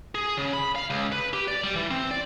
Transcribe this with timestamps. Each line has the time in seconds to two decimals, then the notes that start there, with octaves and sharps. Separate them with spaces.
0.15 G#4
0.37 C#3
0.53 B5
0.76 F5
0.90 C#2
1.12 B4
1.33 G4
1.48 D5
1.63 G3
1.76 E3
1.91 C4
2.11 D5